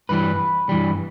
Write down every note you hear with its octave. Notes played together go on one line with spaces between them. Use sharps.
G2 E3 G3 B4
G2 E3 G3